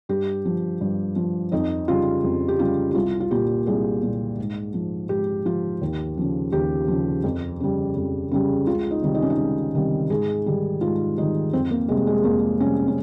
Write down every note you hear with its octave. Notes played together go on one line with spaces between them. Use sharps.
G2 G4
F3
G2
F3
F2 D#4
C#3 G3 F4
F2
G4
C#3 G3 F4
G4
C2 F4
F4
A#2 G3 G4
C2 G#4
A#2 G3
G#2
F3
G#2 G4
F3 F4
D#2
C#3 F3
D#2 G4
C#3 F3
F2
C#3 G3
F2
C#3 G3
C#2 F4
D#4
C3 D#3 G3
D#4
C#4
D#4
C#2
C3 D#3 G3
G#2 G#4
D#3 G3
G#2 F4
D#3 G3 D#4
F2 C4
A#3
C3 G3 G#3
G#3
F2 A#3
C3 G3 C#4
C#4